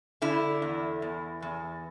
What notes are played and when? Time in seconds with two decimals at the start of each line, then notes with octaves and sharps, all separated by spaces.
0.22 D3 E4
0.62 E2
1.02 E2
1.42 E2